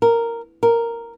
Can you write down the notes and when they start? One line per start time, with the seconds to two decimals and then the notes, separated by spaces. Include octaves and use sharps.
0.02 A#4
0.63 A#4